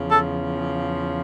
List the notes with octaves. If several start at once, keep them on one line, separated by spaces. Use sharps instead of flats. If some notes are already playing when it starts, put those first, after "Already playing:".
Already playing: E2 C#3 F3
A4